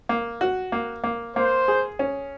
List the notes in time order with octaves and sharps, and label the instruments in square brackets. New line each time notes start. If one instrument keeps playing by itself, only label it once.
[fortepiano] A#3
F#4
A#3
A#3
[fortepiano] A#3 [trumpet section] C5
[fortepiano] G#4
C#4